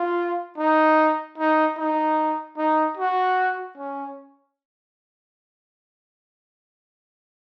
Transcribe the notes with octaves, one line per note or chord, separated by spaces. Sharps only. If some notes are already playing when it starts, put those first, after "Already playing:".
Already playing: F4
D#4
D#4
D#4
D#4
F#4
C#4